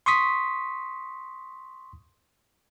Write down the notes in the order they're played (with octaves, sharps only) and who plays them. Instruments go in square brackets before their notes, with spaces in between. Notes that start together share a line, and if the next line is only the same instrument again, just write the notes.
[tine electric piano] C6 C#6 D#6 B6